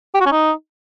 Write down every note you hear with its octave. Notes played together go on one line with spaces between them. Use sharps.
G4
F#4
C#4
D#4